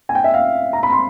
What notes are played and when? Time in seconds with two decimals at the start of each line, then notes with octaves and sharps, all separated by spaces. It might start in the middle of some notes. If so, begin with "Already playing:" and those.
0.09 G#5
0.15 G5
0.24 E5
0.34 F5
0.73 A#5
0.83 B5
0.92 C6